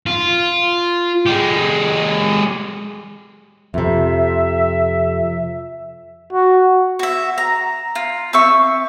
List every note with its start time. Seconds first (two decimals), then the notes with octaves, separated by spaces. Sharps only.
0.07 F4
1.26 G#3 G4
3.74 F2 C3 E5
6.33 F#4
6.99 F#4 E5
7.38 A#5
7.95 F4
8.33 C4 E5 C#6